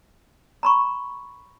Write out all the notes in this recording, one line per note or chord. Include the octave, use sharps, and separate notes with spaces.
A#5 B5 C#6